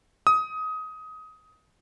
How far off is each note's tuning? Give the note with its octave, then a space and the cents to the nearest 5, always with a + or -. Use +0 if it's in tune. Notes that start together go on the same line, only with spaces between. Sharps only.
D#6 +20